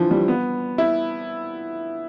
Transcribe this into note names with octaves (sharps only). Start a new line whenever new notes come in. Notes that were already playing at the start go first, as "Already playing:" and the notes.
Already playing: D3 E3 F3
G3
B3
E4